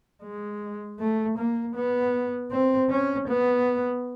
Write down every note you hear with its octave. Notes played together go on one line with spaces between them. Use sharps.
G#3
A3
A#3
B3
C4
C#4
B3